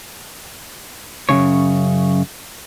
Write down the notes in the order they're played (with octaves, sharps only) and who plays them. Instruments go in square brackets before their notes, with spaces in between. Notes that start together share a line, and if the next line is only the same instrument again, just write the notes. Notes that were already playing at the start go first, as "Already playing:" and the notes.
[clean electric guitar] F#2 A#2 C#3 C#5